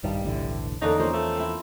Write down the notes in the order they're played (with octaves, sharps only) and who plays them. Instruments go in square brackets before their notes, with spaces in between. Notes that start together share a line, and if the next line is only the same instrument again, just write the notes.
[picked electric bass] A#1 G2 D#3 [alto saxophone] G3
[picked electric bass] F1 B1 E3 [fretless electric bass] A2 D3
[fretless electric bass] E2 [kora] D3 A#3 C#4 [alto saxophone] D#4
[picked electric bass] F3 [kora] A#3 C#4 C5
[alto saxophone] A3
[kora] C4 E4